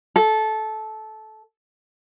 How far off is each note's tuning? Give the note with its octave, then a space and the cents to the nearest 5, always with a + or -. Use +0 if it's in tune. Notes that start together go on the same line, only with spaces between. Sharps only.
A4 -15